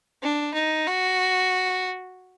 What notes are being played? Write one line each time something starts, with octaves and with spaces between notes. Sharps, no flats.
D4
D#4
F#4